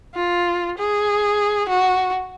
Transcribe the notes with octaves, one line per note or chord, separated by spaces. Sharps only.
F4
G#4
F#4